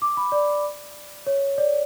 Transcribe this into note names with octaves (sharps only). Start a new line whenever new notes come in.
D6
B5
D5
C#5
D5